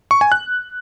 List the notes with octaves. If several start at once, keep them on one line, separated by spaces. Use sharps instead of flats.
C#6
G#5
F#6